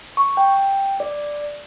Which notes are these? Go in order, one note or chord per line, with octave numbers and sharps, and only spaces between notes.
C#6
G5
D5